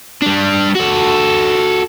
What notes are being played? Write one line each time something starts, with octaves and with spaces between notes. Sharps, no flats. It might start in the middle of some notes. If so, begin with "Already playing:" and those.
G3 D4
F#4 A4